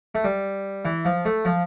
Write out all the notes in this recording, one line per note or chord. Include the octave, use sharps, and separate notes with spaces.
A3
G3
E3
F3
A3
F3